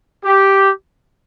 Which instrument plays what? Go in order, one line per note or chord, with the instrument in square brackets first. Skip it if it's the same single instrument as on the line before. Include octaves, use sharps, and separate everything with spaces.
[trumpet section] G4